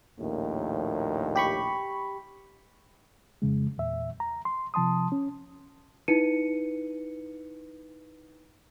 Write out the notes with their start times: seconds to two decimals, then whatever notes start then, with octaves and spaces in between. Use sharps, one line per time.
0.19 A#1 D#2 A2
1.36 G4 B5 C#6
3.42 F2 C#3 G#3
3.78 E2 A#2 E5
4.20 A#5
4.45 C6
4.74 C3 F3 A5 C6 D#6
5.12 C#4
6.08 D#4 E4 B4 C#7 D#7